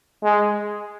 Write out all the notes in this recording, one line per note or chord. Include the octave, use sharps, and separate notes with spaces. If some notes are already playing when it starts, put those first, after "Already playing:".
G#3